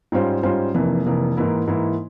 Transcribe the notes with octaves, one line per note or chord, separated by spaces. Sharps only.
G#2 G3 C#4 F4 C5
G#2 G3 C#4 F4 C5
F1 F2 E3 A#3
F1 F2 E3 A#3
G#2 E3 A#3 E4
G#2 E3 A#3 E4